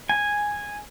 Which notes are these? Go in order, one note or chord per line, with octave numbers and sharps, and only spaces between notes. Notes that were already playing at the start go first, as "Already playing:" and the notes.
G#5